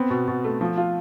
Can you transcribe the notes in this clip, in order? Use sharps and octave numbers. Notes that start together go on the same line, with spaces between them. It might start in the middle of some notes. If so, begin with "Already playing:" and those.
Already playing: B3 C4
B2
B2
A3
F3
F4